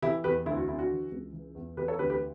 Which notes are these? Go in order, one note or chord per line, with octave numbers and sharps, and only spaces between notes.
E3 E4 G4
E2 G4 B4
D2 E4
F#4
D3 E4
F#4
E3
C#2
E3
E2
E3 G4 B4
A4 C#5
D2 G4 B4
G4 B4